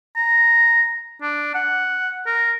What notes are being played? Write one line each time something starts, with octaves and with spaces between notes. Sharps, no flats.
A#5
D4
F#5
A#4